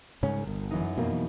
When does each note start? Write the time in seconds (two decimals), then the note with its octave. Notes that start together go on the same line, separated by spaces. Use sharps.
0.23 C2 G#2 C#3 C#4
0.47 G1
0.71 F#2 E3 D#4
0.98 F2 B2 A#3